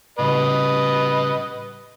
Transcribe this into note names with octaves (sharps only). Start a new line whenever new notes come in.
A2 C#3 G3 B4 D#5